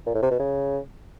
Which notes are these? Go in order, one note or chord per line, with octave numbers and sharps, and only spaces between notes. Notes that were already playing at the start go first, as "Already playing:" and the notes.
A#2
A2
C3
B2
C#3